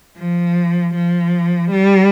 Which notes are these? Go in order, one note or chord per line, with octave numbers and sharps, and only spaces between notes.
F3
F3
G3